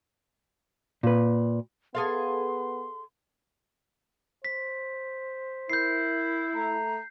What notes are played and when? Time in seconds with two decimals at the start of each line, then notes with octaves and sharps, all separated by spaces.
1.03 A#2 B4
1.95 B3 G#4 A4 F5 C6
4.45 C5 B6
5.69 E4 A#4 G6 C7
6.55 A3 A#5